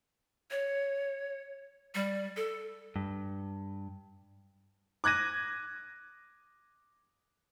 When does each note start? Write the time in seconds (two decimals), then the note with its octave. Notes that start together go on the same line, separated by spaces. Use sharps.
0.51 C#5
1.95 G3
2.37 A4
2.96 G2
5.04 D6 F#6 G#6 A#6 D#7